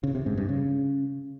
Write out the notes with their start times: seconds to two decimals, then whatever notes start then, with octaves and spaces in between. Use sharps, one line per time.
0.04 C#3
0.15 C3
0.26 G#2
0.37 G2
0.49 C#3